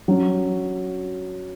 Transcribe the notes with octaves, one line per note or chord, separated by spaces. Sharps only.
F#3 C#4